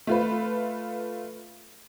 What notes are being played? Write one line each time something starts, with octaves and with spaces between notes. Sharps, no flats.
A3 F4 B4